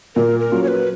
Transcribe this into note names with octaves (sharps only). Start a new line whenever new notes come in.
A#2 A#4
A#4
F#3 A#3 C#4 F4
C#5
B4